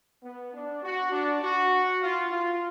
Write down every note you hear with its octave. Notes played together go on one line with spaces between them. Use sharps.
B3
D4
F#4
D4
F#4
F4
F4